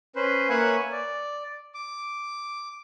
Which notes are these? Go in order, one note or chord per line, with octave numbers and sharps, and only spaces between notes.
C#4 B4 C5
A#3 B4 C#5 E5 F#5 G#5
D5
D6